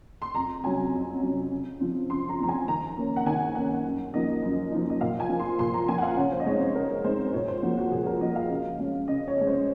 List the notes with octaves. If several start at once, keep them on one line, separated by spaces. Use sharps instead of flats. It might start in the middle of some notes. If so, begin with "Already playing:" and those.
C6
F2 A#5
C3 F#3 C#4 G#5
F2
C3 F#3 C#4
C#3
F3 C4
C#3 C6
A#5
F3 C4 A#5
G#5
D#3 A#5
A#3 C#4
F#5
D#3 G#5
A#3 C#4 F#5
F#2
F3 A#3 D#4 D#5
F#2
F3 A#3 D#4
D#5
A#2 F5
G#5
F3 A#3
C6
A#2 C6
A#5
F3 A#3 G#5
F#5
F5
C#3 C#5
C5
D#5
G#3 C4 D#4 C#5
C5
C#3 A#4
G#3 C4 D#4 C5
C5
A#2 C#5
C5
F3 A#3 F#4
F#4
A#2 G#4
A#4
F3 A#3 D#5
F5
C#3
G#3 C#4
C#3 D#5
C#5
G#3 C#4
C5